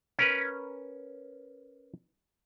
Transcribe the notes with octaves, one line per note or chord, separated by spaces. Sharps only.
C#4 A#4 B4